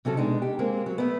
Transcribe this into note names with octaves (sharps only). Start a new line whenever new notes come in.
C3 F#3 C#4 A4
B2 G#3 D4 D#4
G4
G#3 A#3 C4
F#3
A3 B3